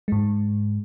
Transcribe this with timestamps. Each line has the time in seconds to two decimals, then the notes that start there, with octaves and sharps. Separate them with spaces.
0.08 G#2 G#3